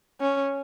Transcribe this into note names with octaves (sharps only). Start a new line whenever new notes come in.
C#4